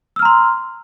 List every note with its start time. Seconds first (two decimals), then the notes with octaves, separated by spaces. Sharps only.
0.16 E6
0.19 F6
0.22 A#5
0.25 C6